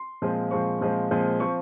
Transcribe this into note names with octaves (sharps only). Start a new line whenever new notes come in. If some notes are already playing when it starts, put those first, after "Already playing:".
Already playing: C6
A#2 F3 G#3 C4
A#2 F3 G#3 C4 C#6
A#2 F3 G#3 C4
A#2 F3 G#3 C4
F3 C4 C#6